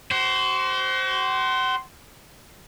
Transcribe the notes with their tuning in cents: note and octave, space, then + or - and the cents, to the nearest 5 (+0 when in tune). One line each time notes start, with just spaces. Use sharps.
F#4 +40 C5 +0